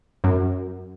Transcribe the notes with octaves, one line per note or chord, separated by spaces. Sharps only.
F#2